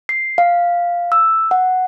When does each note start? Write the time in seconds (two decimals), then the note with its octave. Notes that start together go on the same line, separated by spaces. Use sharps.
0.09 C7
0.38 F5
1.12 E6
1.51 F#5